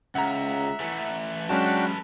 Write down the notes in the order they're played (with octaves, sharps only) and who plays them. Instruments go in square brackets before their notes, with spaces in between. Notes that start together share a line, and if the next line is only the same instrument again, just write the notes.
[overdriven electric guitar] C#2 [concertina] E5 [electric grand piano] F#5 A#5
[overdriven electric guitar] E3 A3
[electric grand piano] F#3 G#3 C#4 [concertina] D4 F#4 G5 [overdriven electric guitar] A4 B4